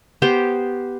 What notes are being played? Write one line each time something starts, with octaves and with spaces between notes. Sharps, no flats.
B3 G4 C5